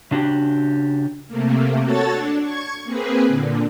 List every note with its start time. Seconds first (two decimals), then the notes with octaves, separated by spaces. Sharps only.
0.11 C#3 D4 F#4 G4
1.28 C3 A3 A#3
1.83 F#4 A4 C#5 A5 A6
2.11 D4
2.42 C#6 G#6
2.84 A#3 C4 G#4 B4
3.28 A#2 D3